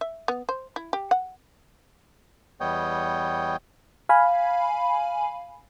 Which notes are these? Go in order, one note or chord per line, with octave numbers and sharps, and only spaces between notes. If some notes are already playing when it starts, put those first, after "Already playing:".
E5
B3
C5
E4
G4
F#5
E2 G3 B3 C#5 D#5 G5
F5 G#5 B5